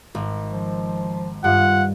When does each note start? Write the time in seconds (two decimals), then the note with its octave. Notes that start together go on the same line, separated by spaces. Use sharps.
0.15 G#1
0.51 F3
1.44 G2 F4 F#5